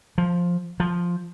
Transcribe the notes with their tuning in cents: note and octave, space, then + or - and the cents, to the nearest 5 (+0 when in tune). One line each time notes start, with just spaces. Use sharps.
F3 +5
F3 +5